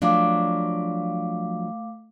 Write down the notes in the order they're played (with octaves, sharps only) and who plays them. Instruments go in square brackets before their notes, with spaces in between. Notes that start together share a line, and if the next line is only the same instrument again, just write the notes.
[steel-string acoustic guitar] F3 F#3 D4 [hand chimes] A3 F5 D6